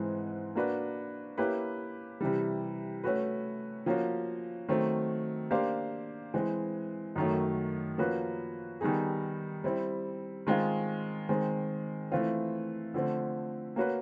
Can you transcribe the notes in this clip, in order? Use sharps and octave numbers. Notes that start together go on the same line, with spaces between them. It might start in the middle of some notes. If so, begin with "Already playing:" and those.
Already playing: G#2 E3 G#3 C4
A#3 D4 F#4 B4
A#3 C#4 E4 G4 B4
C3 E3 G3
A3 C#4 F#4 B4
F3 A#3 C#4 F#4
D#3 F#3 A3 C4
A#3 D4 G4 C5 F5
E3 G#3 C4
F#2 D#3 F#3 A3
F3 A#3 C#4 F#4 B4
D#3 G3 B3 D#4 G#4
G3 C4 E4
D#3 G#3 C4 F4 G#4
D#3 G#3 C4
E3 A3 C4 F4
D3 F3 A3 C4
A#3 C#4 F#4 B4